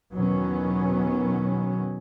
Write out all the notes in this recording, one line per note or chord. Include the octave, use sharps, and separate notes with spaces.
E2 B2 D#3 F#3 B3 C#4